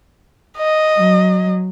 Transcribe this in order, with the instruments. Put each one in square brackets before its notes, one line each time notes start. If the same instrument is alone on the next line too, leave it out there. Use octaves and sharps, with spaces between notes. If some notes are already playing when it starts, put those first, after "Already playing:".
[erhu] D#5
[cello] F#3